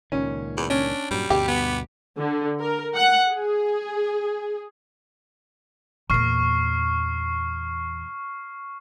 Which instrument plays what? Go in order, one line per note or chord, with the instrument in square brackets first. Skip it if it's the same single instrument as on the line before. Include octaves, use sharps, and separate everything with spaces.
[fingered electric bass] C#2 A#2 D#3 [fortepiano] C#4
[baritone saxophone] E2
[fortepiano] C#4 [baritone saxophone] D4
[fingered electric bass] G2 A#2 F#3 [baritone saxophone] G3
[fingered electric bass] D2 G2 B2 [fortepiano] G4
[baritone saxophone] B3
[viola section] D3
A#4
F#5
G#4
[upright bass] E2 A#2 [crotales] C#6 F6 C7